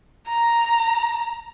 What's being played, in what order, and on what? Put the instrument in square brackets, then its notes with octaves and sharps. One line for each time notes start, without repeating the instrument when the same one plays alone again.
[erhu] A#5